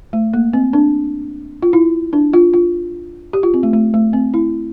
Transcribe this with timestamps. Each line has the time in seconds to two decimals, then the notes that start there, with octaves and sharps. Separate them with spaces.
0.13 A3
0.34 A#3
0.53 C4
0.73 D4
1.62 F4
1.73 E4
2.13 D4
2.33 F4
2.54 F4
3.33 G4
3.43 F4
3.54 C4
3.63 A3
3.73 A3
3.94 A3
4.13 C4
4.34 E4